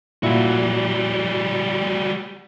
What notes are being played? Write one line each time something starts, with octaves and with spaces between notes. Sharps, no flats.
A#2 G3 E4 F#4